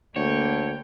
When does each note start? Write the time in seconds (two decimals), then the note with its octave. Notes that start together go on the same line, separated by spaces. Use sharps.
0.16 D2 D3 A#3 C#5 G5